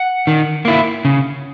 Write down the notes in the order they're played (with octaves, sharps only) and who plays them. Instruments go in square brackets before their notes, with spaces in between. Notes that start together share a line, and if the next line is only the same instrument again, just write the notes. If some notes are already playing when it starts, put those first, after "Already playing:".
Already playing: [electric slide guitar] F#5
D#3
A#3 E4
C#3